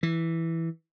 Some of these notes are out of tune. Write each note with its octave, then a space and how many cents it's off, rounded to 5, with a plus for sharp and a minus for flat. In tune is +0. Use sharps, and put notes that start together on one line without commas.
E3 +0